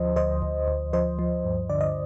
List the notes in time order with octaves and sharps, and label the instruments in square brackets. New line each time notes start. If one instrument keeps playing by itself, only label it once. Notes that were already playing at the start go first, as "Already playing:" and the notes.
Already playing: [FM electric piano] D2 F3 C5 D#5
D2 C5 D#5
D2
D2
F3 C5 D#5
F3
G2
D3 D5
D#5